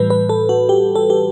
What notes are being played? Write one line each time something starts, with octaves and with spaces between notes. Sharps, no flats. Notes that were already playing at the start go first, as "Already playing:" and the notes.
Already playing: A2 E3 G3 B4
B4
A4
F#4
G4
A4
G4